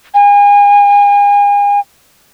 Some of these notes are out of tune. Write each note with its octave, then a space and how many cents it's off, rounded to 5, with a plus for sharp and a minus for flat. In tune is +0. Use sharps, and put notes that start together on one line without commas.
G#5 -35